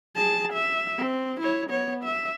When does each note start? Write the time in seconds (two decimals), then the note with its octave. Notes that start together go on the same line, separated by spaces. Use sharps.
0.16 G#4 A5
0.53 E5
0.98 C4
1.41 E4 C#5
1.70 B3 C#5
2.04 E5